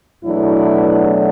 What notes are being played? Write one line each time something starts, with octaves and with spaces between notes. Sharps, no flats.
E2 B2 F#3 A3 D4 E4